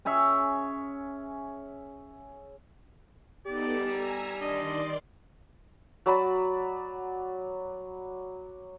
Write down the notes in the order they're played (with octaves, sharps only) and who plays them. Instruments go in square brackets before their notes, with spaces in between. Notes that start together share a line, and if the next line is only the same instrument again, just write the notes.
[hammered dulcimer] C#4 G#4 C#5 E5
[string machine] B3 D#4 A4 [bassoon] G4 [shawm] D5
[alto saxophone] G3 [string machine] G#5 A#5 E6
[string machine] D#3 D5 C6 [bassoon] D4 [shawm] D#5
[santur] F#3 D5 B5